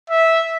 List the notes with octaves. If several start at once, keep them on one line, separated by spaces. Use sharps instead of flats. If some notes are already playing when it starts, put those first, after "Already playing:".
E5